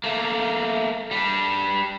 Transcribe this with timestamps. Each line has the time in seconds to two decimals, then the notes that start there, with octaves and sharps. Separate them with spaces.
0.04 A3 A#3
1.11 G3 D4